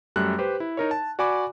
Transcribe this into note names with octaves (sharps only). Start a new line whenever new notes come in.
F#2 G3 A3 F#6
G4 B4 C5
E4
D#4 A#4 C#5
A5
F#4 D5 G#5 B5 D6